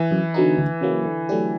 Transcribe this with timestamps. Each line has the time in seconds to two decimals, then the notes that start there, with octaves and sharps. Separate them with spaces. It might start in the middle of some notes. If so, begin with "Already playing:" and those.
Already playing: E3
0.11 F#2
0.34 D3 F#3 B3 D#4
0.58 D2
0.81 C#3 F#3 A#3
1.06 D3
1.29 F#3 A3 D4 G4